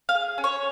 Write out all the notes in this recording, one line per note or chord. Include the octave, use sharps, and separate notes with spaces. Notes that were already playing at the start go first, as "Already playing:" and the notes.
F5
G#4
C#4
C#5